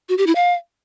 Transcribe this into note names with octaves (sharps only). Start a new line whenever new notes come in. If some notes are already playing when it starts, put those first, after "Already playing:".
F#4
G4
E4
F5